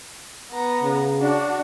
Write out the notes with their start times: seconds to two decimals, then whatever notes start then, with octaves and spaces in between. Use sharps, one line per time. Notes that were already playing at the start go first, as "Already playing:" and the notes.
0.53 B3 A#5
0.83 C#3
1.21 D4 F#4